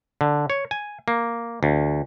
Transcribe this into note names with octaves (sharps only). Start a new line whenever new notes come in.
D3
C#5
G#5
A#3
D2